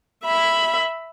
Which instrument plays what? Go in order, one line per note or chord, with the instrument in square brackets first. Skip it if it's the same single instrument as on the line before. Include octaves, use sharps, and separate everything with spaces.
[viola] E5 B5